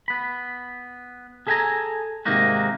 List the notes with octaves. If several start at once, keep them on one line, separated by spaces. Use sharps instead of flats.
B3 B5
G#4 A4 E5 G5 G#5 A#5
G#2 C3 D#3 A#3 D#4 F#4